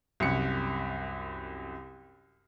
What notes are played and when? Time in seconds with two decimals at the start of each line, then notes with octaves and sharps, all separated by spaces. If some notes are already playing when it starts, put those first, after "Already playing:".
0.20 C2 F#2 C#7